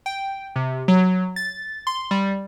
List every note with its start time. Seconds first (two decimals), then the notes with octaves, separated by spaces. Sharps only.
0.06 G5
0.56 C3
0.88 F#3
1.36 A6
1.87 C6
2.11 G3